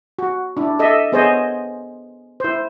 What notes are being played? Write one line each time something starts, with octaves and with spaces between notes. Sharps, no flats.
F#4
D4 E4
A4 D#5 E5
B3 G#4 C5 C#5 D#5
E4 C5